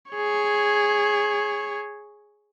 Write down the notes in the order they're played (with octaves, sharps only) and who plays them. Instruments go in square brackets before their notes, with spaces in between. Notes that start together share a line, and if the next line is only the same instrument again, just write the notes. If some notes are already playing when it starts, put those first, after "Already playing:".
[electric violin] G#4 C#5